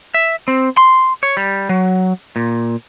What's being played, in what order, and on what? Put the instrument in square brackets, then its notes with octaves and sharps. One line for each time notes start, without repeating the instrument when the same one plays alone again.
[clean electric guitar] E5
C4
C6
C#5
G3
F#3
A#2